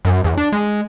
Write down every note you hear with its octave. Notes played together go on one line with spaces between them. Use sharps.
F#2
E2
D4
G#3